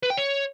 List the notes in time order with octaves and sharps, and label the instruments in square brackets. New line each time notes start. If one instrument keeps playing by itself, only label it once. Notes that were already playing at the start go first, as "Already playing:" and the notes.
[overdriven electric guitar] B4
G5
C#5